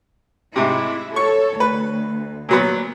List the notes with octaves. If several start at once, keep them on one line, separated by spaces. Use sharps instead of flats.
G#2 C3 E4
A4 C#5 C#6
D2 B4
A#2 F#3 B3